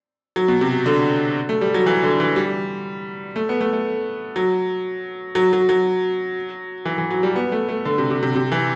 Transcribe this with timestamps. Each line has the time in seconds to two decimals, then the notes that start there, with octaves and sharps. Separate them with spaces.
0.36 F#3
0.48 B2
0.61 C3
0.86 D3
1.49 A3
1.61 G3
1.74 F#3
1.86 E3
2.03 D3
2.20 E3
2.36 G3
3.36 A3
3.49 B3
3.61 A3
3.73 A3
4.36 F#3
5.35 F#3
5.53 F#3
5.69 F#3
6.85 E3
6.98 E3
7.11 F#3
7.23 G3
7.36 B3
7.52 A3
7.69 A3
7.85 D3
7.98 C3
8.10 C3
8.23 C3
8.35 C3
8.52 E3